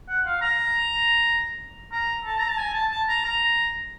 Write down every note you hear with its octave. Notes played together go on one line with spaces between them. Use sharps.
F#5
F5
A#5
A#5
A5
A#5
A5
G#5
A5
A5
A#5
A#5